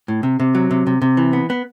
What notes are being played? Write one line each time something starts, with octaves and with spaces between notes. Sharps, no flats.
A2
C3
C3
F#3
C3
C3
C3
E3
B3
B3